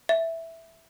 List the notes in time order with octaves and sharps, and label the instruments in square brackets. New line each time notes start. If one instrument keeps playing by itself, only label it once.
[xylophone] E5